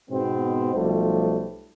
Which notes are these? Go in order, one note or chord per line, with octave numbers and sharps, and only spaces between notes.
G#2 B2 B3 C4
B1 F3 G3 A3